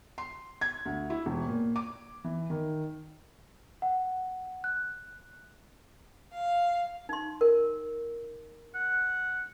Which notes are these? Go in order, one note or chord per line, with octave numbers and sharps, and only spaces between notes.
C6
G#6
D2
E4
E1
A#2
D6
E3
D#3
F#5
F#6
F5
D#4 C6
A#4
F#5